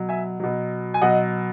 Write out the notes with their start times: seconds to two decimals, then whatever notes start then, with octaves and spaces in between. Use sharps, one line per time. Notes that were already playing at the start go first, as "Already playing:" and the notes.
Already playing: B2 F#3
0.09 E5 G#5
0.40 B2 F#3
0.94 G#5
1.02 B2 F#3 D#5 F#5